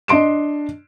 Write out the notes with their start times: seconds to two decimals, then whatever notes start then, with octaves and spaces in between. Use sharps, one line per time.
0.08 D4 D#5 C6 D7 E7